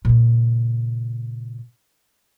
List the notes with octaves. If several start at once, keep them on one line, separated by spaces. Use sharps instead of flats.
A#2 C#3